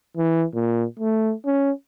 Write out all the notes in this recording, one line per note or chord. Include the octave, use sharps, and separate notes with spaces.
E3
A#2
A3
C#4